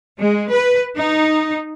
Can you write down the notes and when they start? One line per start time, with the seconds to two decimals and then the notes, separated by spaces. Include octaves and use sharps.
0.19 G#3
0.50 B4
0.96 D#4